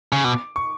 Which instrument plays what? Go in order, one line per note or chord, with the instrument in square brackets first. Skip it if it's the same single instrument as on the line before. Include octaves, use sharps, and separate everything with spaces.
[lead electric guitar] C#3
[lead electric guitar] B2 [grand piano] D6
[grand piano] C#6